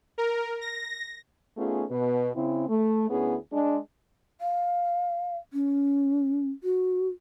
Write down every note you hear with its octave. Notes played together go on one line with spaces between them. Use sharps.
A#4
A#6
A3 B3 C#4 D#4 F4 G#4
B2 B4
C#3 C4 E4
A3
D2 B3 C#4 E4 G#4
G#3 D4
F5
C#4
F#4